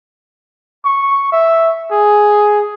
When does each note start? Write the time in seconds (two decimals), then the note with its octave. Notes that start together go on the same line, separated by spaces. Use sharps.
0.85 C#6
1.32 E5
1.92 G#4